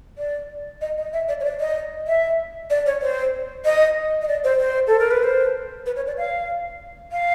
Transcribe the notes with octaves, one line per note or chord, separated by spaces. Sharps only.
D5
D#5
D#5
E5
D5
C#5
D5
D#5
E5
D5
C#5
C5
D#5
D#5
D5
C5
C5
A4
A#4
B4
C5
B4
C#5
D5
F5
F5